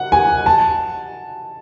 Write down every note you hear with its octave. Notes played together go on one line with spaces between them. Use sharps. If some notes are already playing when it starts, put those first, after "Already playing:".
Already playing: F#5
G#5
A5